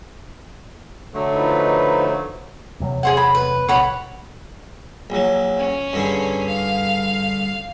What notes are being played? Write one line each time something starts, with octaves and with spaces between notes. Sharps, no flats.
D3 F#3 A3
F3 D#4 B4
E2 C3 F#3
G#4 C5 F#5
B5
B4
A#1 B2 C#5 F#5 B5
A#1 F#3
C#4
G2 D3 G#4
F5